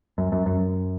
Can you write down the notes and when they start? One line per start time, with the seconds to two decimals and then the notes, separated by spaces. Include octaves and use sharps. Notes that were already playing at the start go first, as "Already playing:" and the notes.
0.18 F#2
0.32 F#2
0.46 F#2